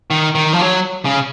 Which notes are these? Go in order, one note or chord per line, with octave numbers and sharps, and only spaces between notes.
D#3
D#3
F3
F#3
C#3